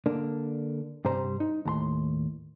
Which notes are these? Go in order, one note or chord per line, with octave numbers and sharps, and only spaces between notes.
D3 A#3 D4
G2 C3 G3 C5 A#5
D#4
D#2 A2 A#5 C6